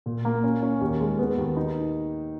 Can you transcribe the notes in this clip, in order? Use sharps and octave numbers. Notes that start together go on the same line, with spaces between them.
A#2
A#3
C#4
C#4
D#2
G#3
B3
D#2
D#4